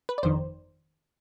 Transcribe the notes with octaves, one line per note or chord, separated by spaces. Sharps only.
B4
D5
G1 F2 D#3 C5